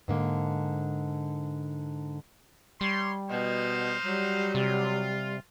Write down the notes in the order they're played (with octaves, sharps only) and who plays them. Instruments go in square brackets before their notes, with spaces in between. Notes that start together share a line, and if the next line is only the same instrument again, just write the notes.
[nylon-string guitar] G#2 D3 A#3
[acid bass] G3 [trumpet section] C#5 C6
[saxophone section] B2 [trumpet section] D#4 C5 F5
[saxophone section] F#3 [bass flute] G3
[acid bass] C3 [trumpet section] F4